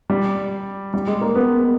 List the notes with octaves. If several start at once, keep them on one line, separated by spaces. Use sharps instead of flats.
G3
G3
G#3
A#3
B3